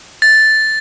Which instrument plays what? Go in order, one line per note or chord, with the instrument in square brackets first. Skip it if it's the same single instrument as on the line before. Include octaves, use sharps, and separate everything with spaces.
[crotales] A6